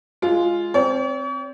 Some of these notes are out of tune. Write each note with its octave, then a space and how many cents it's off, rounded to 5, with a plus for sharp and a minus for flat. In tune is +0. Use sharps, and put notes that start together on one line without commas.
G#3 +0 F4 -5
C4 +0 C#5 +45